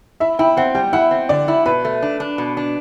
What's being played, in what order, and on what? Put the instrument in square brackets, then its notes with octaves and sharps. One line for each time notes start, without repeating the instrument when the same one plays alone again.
[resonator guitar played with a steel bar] E4 [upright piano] E5
[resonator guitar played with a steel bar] E4 [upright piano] G5
[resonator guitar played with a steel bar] C4 [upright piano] F#5
[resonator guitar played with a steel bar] G3 [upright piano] G5
[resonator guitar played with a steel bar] E4 [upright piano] F#5
[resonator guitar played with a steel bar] C4
[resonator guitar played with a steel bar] D3 [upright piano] D5
[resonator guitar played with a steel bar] E4
[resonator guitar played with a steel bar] B2 [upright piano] B4
[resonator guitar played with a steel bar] A3
D4
D4
B2
D4